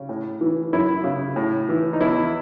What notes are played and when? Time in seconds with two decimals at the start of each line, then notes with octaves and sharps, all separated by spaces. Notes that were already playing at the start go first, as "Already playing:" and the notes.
Already playing: C#3
0.09 A2
0.41 E3
0.73 F#2 E4
1.04 C#3
1.36 A2
1.69 E3
1.93 D#4
2.01 E2 E4